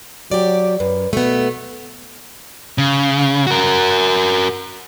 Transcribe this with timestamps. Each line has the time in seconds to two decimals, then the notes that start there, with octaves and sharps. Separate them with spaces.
0.31 F#3 G4 D5
0.80 F#2 B4
1.13 B2 A3 B3
2.78 C#3
3.47 F#4 A#4